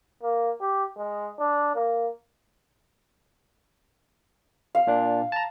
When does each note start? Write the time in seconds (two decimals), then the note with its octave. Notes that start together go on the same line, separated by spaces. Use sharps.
0.22 A#3
0.61 G4
0.97 G#3
1.39 D4
1.75 A#3
4.75 F5
4.87 A#2 D4
5.32 A5 A#5